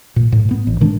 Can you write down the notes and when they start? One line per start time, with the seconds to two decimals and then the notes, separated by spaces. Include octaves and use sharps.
0.16 A#2
0.32 A2
0.49 A2 B3
0.67 A1
0.81 A2 D#3 G#3 D4